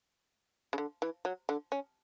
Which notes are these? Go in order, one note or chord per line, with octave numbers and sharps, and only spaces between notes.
C#3
D3
E3
F#3
D3
C#4